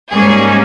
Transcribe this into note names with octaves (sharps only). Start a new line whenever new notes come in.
G#2 G3 A#3 C#4 G#4